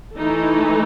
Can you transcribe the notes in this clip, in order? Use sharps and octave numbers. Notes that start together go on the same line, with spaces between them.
E3 A3 D#4 A4